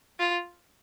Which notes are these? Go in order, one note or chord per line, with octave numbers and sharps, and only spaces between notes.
F4